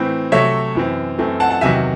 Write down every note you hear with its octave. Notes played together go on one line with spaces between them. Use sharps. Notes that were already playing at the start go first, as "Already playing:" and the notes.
Already playing: A2 E3 C4
C3 F#3 A3 C#5 E5
F#2 E3 C4
F#2 E3 A3 C4
F#5 A5
F#5 A5
E2 C3 D#3 F#3 E5 G#5